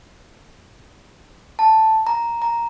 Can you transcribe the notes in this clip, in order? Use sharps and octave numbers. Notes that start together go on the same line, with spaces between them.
A5
A#5
A#5